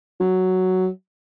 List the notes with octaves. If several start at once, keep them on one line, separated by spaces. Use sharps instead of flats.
F#3